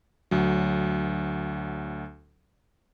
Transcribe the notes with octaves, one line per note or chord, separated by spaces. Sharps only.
D2 F#3